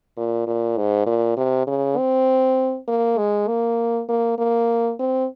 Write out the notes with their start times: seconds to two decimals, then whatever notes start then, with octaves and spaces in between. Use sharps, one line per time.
0.17 A#2
0.47 A#2
0.77 G#2
1.06 A#2
1.37 C3
1.67 C#3
1.97 C4
2.88 A#3
3.18 G#3
3.48 A#3
4.09 A#3
4.38 A#3
4.99 C4